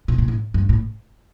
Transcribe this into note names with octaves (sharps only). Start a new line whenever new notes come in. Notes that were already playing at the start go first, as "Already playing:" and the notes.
B2
A#2
A2
G2
A2